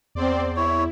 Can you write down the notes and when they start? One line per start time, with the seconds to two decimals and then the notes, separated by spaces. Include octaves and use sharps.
0.15 E2 C4 C5 D5
0.56 E4 C#5